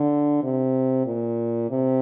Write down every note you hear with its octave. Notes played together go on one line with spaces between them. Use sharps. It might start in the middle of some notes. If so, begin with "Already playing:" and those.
Already playing: D3
C3
A#2
C3